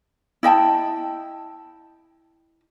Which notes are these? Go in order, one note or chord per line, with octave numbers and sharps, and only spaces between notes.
E4 D#5 G5 A5